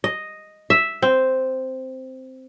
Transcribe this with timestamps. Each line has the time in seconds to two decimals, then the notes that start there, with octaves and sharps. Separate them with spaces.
0.04 D#5
0.70 E5
1.02 C4